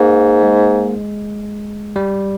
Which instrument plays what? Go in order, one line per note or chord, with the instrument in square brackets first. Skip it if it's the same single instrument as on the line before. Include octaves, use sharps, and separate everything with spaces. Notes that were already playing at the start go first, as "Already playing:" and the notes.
Already playing: [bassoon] G#2 [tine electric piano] A#3
[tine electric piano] G#3
G3